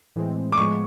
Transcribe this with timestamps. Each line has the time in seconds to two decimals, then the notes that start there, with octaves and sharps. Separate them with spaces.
0.16 A2 E3 G#3 C4
0.52 D6
0.57 A2 F3 G#3 B3 C#6